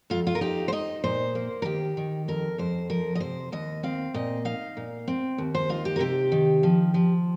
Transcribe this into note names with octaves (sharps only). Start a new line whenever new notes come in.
F2 F4
F4
A#4
D#4 G4
C5
D#4 D#5
A#2 C5
A#3
A#4
D#3 G4
D#3
F2 A#4
F2 C5
F3 A#4
D#5
C3 C5
D#2 D#5
C4 F5
A#2 D#5
D#4 F5
A#2
C4
D#2
C5
D#4 F4
G4
A#4
C3 G4
D#3
F3
F3